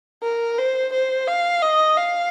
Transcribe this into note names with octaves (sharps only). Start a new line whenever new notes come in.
A#4
C5
C5
F5
D#5
F5